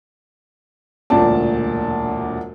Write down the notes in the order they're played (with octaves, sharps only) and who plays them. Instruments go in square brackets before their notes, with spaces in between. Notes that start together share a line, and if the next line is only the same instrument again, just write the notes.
[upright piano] E1 D2 A#2 D5 A5